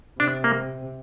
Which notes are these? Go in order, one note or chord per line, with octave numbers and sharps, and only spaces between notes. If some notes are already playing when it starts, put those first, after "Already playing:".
C3 D4
A#3